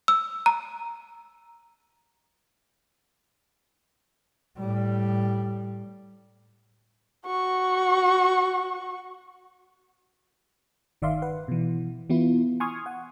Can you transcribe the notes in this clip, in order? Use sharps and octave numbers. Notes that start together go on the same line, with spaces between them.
E6
A#5
A2 G3
F#4 C#6
G1 D#3 D5 E5 F5 C6
B4 F#5
B2 E3
E3 B3 E4 F4
G#5 C6 C#6 D#6 F6 G#6
F#5